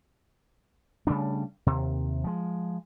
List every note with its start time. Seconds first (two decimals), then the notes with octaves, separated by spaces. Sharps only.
1.07 C#3 G3 A3 D4
1.66 D#2 C3
2.24 F3 G#3